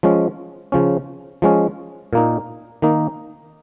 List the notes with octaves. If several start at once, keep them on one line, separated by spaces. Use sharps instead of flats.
F3 G#3 C#4
C#3 F3 C#4
F3 G#3 C#4
A#2 A#3 D#4
D#3 A#3 D#4